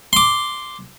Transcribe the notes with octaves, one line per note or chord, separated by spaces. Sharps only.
C6 D6